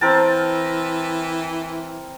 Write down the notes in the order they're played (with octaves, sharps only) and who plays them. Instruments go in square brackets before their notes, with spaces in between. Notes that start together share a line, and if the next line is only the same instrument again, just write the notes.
[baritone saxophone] E3 [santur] C4 A#4 A5